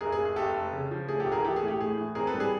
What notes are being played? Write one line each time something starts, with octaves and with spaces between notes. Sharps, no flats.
F1 G#4 A#4
G#4
F1
G#4
F1 G4 A4
F1
C#3
F3
A3 G#4
G4 A4
D2
G#4 A#4
E3 G4 A4
G#4
A3
G4
A2 G#4
E3
C4 G#4 A#4
A4 B4
G3
G#4